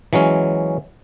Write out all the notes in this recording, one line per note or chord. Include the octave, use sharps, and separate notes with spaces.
E3 F#3 G#3 C#4